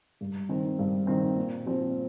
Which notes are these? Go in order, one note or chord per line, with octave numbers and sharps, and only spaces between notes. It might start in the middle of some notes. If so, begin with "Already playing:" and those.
G2
D#3 C4
G2
D#3 C4
A#2
F3 C4 F4 C5